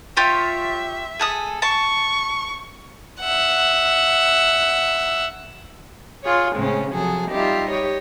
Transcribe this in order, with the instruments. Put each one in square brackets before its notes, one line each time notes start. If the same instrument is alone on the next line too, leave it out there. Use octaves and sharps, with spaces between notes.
[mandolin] F4 G4 C#5 [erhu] E5
[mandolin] G#4 A4 D#6
[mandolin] A5 [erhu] C#6
[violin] E5 F#5
[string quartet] F4 G#4 C#5
A2 C#3 G#3 C4 C#4
C3 F3 F#3 G#4 A4
G3 D#4 F4 G4 E5
G4 C#5 D#5